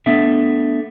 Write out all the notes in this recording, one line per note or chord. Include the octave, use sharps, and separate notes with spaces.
A3 B3 D4 E5